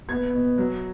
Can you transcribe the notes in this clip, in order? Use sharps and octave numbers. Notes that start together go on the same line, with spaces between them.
B3 G#6
B2
F#3